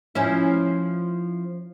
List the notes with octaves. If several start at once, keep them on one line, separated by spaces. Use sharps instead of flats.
F3 C#4 E4